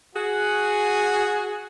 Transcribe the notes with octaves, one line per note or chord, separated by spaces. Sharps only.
F#4 G#4